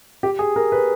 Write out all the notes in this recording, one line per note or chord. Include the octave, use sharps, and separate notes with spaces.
G4
G#4
A#4
B4